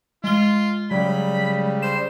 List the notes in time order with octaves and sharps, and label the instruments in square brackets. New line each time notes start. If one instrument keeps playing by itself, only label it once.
[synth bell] G#3 G7 [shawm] F4
[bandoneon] C#3 G3 [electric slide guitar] F#3 [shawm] B5
[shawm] C5 [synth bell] E7